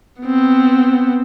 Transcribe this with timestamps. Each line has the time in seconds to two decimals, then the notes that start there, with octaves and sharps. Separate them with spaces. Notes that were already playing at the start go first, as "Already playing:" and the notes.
0.22 B3 C4